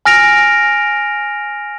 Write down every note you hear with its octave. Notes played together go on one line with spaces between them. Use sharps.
G#5 F6 A#6 D7 F7